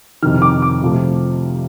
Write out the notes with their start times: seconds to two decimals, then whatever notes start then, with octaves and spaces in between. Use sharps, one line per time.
0.22 F2 C3 D#3 F6
0.42 D6
0.62 D6
0.82 C3 F3 A3